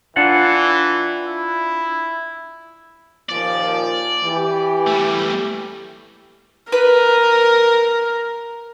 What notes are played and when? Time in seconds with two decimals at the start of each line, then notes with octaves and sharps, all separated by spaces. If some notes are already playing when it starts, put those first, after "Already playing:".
0.16 E3 D4 F4 F#5
1.26 E4
3.29 D#2 A#2 F3 D5
4.24 E3 G4
4.87 G3 A3
6.72 A#4 B4